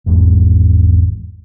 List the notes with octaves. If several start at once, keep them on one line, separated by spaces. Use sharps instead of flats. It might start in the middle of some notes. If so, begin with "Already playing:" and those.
G#1 E2 G#2 G#3